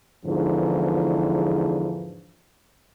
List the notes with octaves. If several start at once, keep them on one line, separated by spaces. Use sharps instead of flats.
E2 G#2 D3 E3 F3